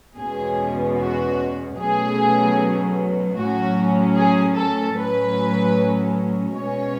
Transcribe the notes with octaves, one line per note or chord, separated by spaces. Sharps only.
E2 B2 G#3 C#4 G#4
F#4
B2 F#3 A3 C#4 G#4
A2 F#3 C#4 F#4
G#4
A4
A2 F#3 C#4 B4
B2 G#3 C#4 C#5